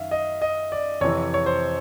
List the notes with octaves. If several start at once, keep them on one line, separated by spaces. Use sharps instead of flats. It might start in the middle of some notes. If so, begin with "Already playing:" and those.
Already playing: F#2 D#3 E5 F5
D#5
D#5
D5
F2 C3 E3 C#5
C#5
C5